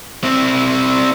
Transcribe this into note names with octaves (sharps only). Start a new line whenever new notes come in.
C4 E4